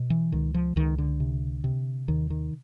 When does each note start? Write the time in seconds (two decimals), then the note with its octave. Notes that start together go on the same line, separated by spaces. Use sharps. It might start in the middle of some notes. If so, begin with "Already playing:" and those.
Already playing: B2
0.10 E3
0.32 C#2 D#3
0.54 F3
0.76 C#2 D#3
0.98 D3
1.20 C3
1.64 C3
2.08 D#2 D#3
2.30 D#3